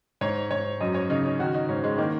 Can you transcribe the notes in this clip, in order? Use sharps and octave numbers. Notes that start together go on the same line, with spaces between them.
G#2 C#5
G#2 C#5
F#2 D#5
C#5
C#3 D#4
C#4
D#3 F#4
D#4
G#2 C#4
G#3
D#3 A#3